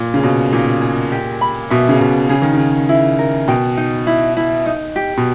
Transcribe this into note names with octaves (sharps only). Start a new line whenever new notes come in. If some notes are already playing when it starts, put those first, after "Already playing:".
Already playing: A#2
C#3
B2 C#4
A#2 D#4
G#4
G4
B5
B2 E5
C#3
B2 B4
C#3 G#4
D#3
C#3
G#4
E4
A#4
B2 G5
D#4
E4
E4
D#4
G4
B2